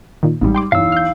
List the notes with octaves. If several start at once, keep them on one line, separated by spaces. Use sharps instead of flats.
A#2 D#3
A1 G#2 G3
G5 C6 D6
B1 E2 F5 E6
F6 G6